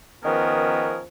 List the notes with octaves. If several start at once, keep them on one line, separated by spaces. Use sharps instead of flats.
D#3 F3 B3 C#4 G#4 A#4